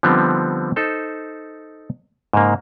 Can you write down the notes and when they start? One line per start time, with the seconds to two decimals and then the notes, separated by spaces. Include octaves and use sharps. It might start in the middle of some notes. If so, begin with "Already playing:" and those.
0.03 D3 F3 G3 B3 C4 D#4
0.76 D#4 A4 C5
2.33 G#2 C#3 A#3